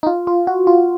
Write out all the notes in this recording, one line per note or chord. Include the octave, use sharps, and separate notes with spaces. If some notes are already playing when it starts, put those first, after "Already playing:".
D#4
F4
F4
F#4
F4